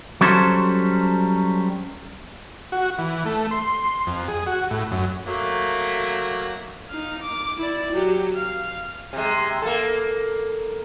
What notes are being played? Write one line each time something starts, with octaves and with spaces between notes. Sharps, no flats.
F#3 G3 C#4 A4 C5
F#4
E3
A3
C6
F2
G#4
F#4
A2
F#2
F#3 A3 A#3
D#4 F5
D6
E4 D5
F#3 G4
F5
C3 G#3
A#3 A4